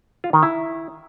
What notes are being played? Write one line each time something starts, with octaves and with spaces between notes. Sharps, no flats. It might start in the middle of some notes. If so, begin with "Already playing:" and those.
F4
D#3
E4